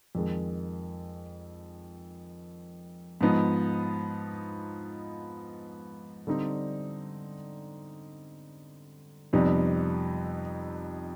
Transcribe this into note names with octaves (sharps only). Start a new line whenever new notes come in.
F2 D#3 G#3
G#2 F3 B3 D#4
D3 G3 C4 D#4
F2 C3 G3 B3 D#4